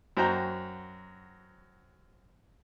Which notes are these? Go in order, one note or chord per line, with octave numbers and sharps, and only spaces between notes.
F#2 F#4 C5 G5 A#5